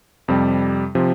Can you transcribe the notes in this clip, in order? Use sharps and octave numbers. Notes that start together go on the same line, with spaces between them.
F2 C3 G3
C3 F3